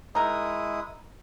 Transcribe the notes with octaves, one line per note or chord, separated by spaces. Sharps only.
G#3 D#4 E4 A#4 D#6